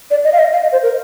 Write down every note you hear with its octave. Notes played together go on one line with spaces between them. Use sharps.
D5
D#5
F5
D#5
F5
D#5
C5
A#4